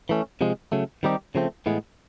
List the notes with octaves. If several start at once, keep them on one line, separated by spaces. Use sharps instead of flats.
E3 A3 C#4
C3 F3 G#3
C#3 F#3 A3
D#3 G3 C4 D#4 G4
C#3 F3 A3 C4
A2 E3 G#3 B3